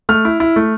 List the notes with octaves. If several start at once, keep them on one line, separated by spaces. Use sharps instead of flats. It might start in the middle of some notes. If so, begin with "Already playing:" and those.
A3 F6
E4
E4
A3